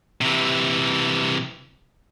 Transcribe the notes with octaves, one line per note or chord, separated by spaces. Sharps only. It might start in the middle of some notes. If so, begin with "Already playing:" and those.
C3 E3